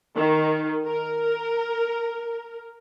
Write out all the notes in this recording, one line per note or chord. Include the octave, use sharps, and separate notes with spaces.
D#3
A#4